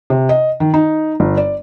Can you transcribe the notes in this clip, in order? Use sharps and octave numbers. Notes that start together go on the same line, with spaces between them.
C3
D#5
D#3
D#4
G1
D5